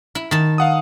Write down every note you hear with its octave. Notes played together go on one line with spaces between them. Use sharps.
E4
D#3 A5
F5 F#5 D#6